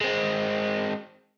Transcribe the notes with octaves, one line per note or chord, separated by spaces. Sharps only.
G#3 C4